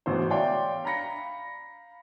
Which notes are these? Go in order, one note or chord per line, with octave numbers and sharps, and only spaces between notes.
E1 A1 B2 E3 F#4 C5
C#5 D5 E5 F5 G5 C6
F5 A#5 B5 A#6 C#7